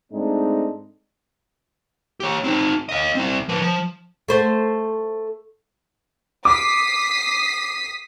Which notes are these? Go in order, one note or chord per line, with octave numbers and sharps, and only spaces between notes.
G#2 G#3 A3 C4 D4 D#4
G4 C#5
C4 D#4
D#5 F5
C4 E4
F3 B4
F3
A3 C5
D6 D#6 B6 C7